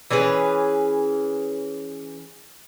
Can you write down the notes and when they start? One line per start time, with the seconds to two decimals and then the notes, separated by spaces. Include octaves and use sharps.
0.10 E3 C#4 G#4 B4